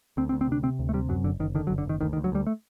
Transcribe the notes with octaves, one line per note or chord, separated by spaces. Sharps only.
D2 C4
C4
D2
C4
C3 D4
C3 C4
D2
A3
C3 G3
F#2 F#3
F#1 D3
F#1 D#3
D3 D#3
F#3
F#1
D3
F#1 D#3
D2 D#3
D#3
D2
F#3
D2 G3
A3